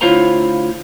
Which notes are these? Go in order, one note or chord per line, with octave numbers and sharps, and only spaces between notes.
D2 E4 F4 C5 C#5 A#5